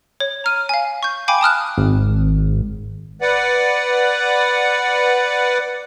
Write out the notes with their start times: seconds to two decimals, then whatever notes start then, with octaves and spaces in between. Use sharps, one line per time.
0.20 C#5
0.44 A#5 F6 D#7
0.69 F5 G#5
1.03 C#6 G6
1.28 F5 G5 G#5 B5 D6
1.41 A5 D#6 F6 F#6
1.77 G#1
3.21 B4 D5 F#5